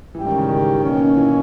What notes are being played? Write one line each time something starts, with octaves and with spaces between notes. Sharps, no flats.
G#2 E3 G3 C#4 G4
D#3
C#3
D#3
B2 A#3 C#4
E3